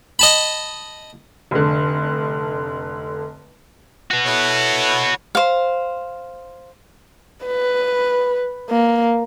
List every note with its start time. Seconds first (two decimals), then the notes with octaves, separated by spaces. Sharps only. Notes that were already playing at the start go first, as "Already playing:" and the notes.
0.19 D#5 A5 B5
1.51 F1 D3
4.11 F#4 B4
4.26 E4 A4 C#5
5.35 C5 F5
7.46 B4
8.70 A#3